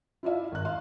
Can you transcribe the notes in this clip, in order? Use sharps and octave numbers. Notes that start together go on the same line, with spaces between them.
E4 F4 D5 E5 F5
G#1 F#6
F5 C6